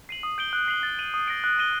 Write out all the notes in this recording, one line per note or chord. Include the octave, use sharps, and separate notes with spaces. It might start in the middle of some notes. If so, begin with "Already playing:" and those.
C7 D#7 F#7
D#6
G6 D7 G7
F#6
C7 F#7
A6
D#7 F#7
D#6
F#6 A#6 D7
F#6
A#6 D#7 G7